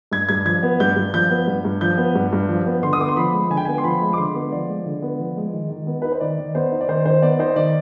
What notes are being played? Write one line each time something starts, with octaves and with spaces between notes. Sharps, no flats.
G2 G#6
G2 G#6
F3 G#6
B3
G2 G6
G2
F3 G6
B3
G2
G2
F3 G6
B3
G2
G2
F3
B3
D3 C6
D#6
B3 D6
C6
F3 B5
G#3
D3 G#5
G5
B3 G#5
C6
F3 B5
G#3
D6
D3 C6
B3
F3 D5
G#3
D3
B3
F3
G#3
D#3
D#3
B3
D#4 B4
C5
D#3 D5
D#3
B3 C5
D#4
D5
D#3 C5
D#3 C5
B3 D5
D#4 C5
D#3 D5